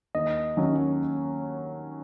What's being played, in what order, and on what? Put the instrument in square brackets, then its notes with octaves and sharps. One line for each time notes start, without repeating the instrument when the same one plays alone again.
[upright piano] D#2 [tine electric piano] D#5
[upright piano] D#3 F#3 C#4